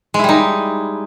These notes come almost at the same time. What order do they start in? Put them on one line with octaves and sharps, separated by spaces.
G#3 E4 G3 D#4